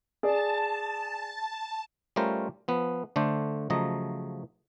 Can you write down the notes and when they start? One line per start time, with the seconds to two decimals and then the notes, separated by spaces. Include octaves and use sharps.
0.23 G#4 D5 A5
2.16 G3 A3 C#4 F4 A#4 C5
2.68 F3 B3 B4
3.16 D3 A3 D4 C5
3.70 C#3 F3 F#3 A3 D#5 A#5